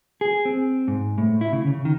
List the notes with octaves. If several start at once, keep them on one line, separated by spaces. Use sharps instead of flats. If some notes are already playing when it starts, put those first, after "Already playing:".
G#4
C4
G#2
A2
E4
C#3
C#3
D#3